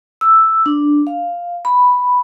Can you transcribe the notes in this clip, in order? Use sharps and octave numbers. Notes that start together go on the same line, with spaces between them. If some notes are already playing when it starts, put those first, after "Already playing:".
E6
D4
F5
B5